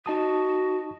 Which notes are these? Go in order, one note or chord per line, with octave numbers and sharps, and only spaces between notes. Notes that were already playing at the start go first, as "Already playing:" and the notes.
D#4 F#4 A5 D#6